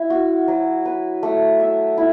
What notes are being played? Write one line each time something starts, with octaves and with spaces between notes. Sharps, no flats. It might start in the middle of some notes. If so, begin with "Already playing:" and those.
Already playing: E4
F#4
F#3
B4
A3
E5
E4